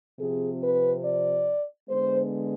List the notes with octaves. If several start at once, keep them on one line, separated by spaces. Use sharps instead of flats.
C3 F3 C4 G#4
B4
D5
D3 G#3 B3 C5